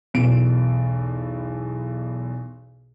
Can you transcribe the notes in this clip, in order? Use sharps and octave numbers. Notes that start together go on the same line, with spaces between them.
B1 E2 B2 D7